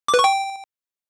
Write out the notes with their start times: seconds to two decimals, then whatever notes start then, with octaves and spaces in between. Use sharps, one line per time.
0.08 D6
0.14 B4
0.19 C#6
0.24 G5